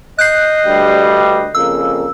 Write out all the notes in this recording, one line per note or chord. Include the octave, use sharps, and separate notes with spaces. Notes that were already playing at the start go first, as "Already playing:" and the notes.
D#5 F#6 G6 C7
D2 G2 G3
F2 C#3 A#3 E6